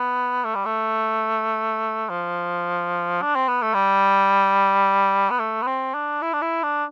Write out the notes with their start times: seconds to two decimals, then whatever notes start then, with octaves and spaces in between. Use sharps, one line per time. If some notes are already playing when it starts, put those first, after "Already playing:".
Already playing: B3
0.44 A3
0.55 G3
0.65 A3
2.09 F3
3.22 D4
3.35 C4
3.48 B3
3.62 A3
3.74 G3
5.30 B3
5.39 A3
5.62 B3
5.67 C4
5.94 D4
6.22 E4
6.33 D4
6.42 E4
6.63 D4